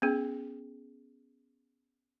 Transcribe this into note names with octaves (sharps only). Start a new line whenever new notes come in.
B3 C#4 G#4